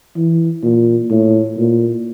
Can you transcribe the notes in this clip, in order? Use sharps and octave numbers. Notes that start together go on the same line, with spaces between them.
E3
A#2
A2
A#2